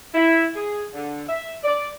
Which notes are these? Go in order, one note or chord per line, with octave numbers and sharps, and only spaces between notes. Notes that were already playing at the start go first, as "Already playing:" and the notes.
E4
G#4
D3
E5
D5